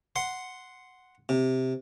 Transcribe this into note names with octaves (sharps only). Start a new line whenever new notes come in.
F#5 C6
C3